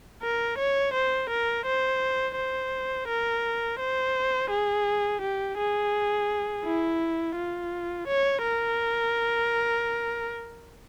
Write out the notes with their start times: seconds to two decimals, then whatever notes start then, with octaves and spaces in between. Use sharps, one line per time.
0.22 A#4
0.59 C#5
0.94 C5
1.30 A#4
1.66 C5
2.37 C5
3.08 A#4
3.80 C5
4.51 G#4
5.22 G4
5.58 G#4
6.64 E4
7.36 F4
8.07 C#5
8.43 A#4